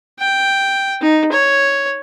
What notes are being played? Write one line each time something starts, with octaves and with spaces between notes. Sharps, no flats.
G5
D#4
C#5